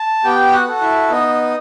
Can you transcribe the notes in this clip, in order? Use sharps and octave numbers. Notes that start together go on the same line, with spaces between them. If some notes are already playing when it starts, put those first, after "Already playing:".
Already playing: A5
B3 G4 G5
F#4 F#5
F#4 A4
E4 E5
B3 D#4 D#5